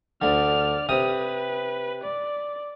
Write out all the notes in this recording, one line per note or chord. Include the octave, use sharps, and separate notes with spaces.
D2 D3 D5 F6
C3 B4 D#6
D5